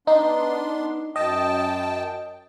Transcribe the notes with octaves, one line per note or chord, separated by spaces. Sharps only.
B3 D4 D#4 C6
F#2 D#5 G5 A5